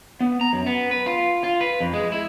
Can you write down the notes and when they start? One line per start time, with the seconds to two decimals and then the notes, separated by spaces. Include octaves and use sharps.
0.21 B3
0.41 A#5
0.53 F#2
0.67 B3
0.91 B4
1.06 F4
1.44 F4
1.61 B4
1.80 F2
1.93 G#3
2.12 E4